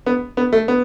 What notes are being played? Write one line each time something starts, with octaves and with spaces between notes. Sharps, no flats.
B3
B3
A3
B3